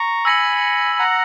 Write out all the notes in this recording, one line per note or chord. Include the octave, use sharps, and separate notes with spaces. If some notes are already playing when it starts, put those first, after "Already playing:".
Already playing: A#5 C#6
G#5 B5 E6 A#6 C#7 F#7
F#5 A#5